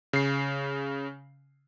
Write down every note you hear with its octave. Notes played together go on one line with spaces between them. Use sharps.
C#3 C7